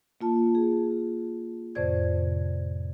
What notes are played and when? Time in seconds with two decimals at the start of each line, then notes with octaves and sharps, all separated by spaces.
0.21 A#3 F4 A5
0.55 G#4
1.75 F2 A2 C3 C5 D5 G#6